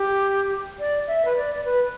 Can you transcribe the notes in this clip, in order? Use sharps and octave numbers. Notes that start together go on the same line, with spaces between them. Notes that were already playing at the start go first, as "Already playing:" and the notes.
Already playing: G4
D5
E5
B4
D5
D5
B4